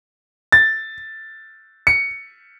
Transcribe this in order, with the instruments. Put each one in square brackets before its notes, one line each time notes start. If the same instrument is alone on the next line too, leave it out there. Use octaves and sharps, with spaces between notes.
[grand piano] A6
C#7